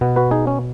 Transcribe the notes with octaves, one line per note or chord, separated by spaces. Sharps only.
B2 B3
F#4 B4
D#4 G#4
C#4